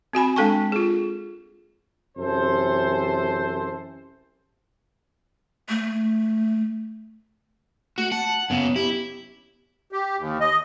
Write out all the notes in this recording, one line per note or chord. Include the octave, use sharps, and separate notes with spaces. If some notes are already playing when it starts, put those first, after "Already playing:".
C4 F#4 G#5 B5
G#3 D4 A4 G5 A5 C#6
F4 G#4
F#2 C3 E3 A4 C5
A3
A3 F#4
F#5 A5
F#2 C#3 B3
E4 G4
G4
D#2
D#5